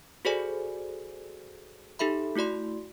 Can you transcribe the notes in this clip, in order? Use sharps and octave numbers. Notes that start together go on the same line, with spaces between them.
F#4 G#4 A4 C5 D5 G#5
D#4 G4 A4 E5 B5
A3 E4 F#4 D5 C6